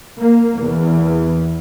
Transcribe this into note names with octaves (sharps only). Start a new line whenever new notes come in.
A#3
E2